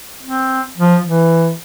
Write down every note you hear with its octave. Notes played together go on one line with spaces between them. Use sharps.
C4
F3
E3